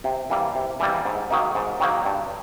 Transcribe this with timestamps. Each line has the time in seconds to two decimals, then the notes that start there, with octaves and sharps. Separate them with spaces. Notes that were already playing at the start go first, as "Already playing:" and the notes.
0.04 C3
0.30 E3 G3 A#3
0.55 C3
0.80 E3 G3 A#3
1.05 G#2
1.30 D#3 F#3 A#3 D#4
1.55 G#2
1.80 D#3 F#3 A#3 D#4
2.05 G2